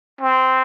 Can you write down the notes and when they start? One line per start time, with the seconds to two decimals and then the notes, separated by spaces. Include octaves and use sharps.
0.21 C4